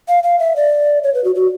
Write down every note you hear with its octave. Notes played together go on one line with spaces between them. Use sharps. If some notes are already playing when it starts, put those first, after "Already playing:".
F5
F5
E5
D5
C#5
B4
F#4
F#4